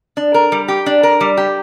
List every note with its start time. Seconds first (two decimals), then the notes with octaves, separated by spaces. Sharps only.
0.17 D4
0.34 A#4
0.52 G3
0.68 G4
0.86 D4
1.03 A#4
1.21 G3
1.37 G4